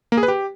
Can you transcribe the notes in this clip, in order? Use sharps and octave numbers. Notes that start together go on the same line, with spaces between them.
A#3
G#4
B4
G4